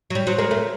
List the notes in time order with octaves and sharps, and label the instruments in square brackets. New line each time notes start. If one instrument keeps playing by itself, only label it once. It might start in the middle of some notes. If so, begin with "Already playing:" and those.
[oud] F#3
[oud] G3 [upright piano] C#5
[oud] F#3 [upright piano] C5
[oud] G#3 [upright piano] A#4
[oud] A3 [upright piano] A#4